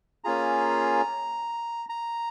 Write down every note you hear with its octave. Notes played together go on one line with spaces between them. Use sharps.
A#3 C#4 F4 G#4 A#5
A#5